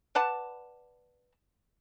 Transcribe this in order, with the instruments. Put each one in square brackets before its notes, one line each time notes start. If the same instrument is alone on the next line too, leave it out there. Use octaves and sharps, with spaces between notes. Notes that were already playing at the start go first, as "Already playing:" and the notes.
[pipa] B4 D5 F#5 A5